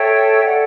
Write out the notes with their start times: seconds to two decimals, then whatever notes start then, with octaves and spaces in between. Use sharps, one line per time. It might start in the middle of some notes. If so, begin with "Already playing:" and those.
Already playing: A4 C#5 E5 G5
0.43 A4 D5 F#5